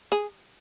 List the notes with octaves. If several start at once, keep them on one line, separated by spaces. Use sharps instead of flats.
G#4